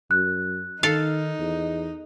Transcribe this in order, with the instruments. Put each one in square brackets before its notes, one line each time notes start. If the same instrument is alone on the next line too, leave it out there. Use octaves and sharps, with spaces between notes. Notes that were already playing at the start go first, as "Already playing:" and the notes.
[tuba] F#2 [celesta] F#6
[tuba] D#3 [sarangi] D#4 [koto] A4 F5
[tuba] E2